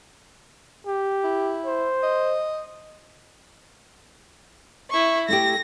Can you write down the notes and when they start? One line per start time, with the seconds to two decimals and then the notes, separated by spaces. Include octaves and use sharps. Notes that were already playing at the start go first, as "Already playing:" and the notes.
0.87 G4
1.24 E4
1.66 C5
2.03 D#5
4.90 E4 C#6
5.28 A3 E4 G4 A#6